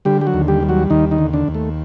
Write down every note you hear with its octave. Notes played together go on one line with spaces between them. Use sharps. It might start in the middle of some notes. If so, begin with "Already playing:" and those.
D3 G3 G4
G4
F#3 F#4
D#2
G3 G4
G3
F#3 F#4
D#2 D#3 D#4
D#3 D#4
D3
D3 D4
D#2
A3